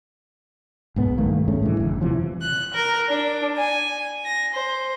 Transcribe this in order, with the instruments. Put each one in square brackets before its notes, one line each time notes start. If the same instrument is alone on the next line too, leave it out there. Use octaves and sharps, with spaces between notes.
[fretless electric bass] B1 G#2 B3
G2 D#3 A3 A#3
G2 G#3 A3 C#4
A2 D3 E3 G#3
F#1
F#2 C3 E3 F3
[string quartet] F#6
A#4
D4
G#5
A#6
C5